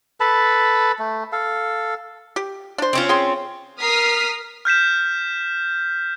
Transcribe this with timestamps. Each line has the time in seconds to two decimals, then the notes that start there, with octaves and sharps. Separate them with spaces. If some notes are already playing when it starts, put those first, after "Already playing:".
0.20 A4 B4 A5 B5
0.99 A3
1.32 A4 F5
2.36 G4
2.78 D4 C5
2.93 C4 C#4 F4
3.09 G#4 G5 C6
3.79 A#4 D#6 F6 B6 C7
4.65 F6 G6 B6 E7